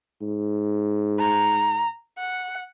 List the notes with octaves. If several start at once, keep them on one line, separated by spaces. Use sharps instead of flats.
G#2
A#5
F#5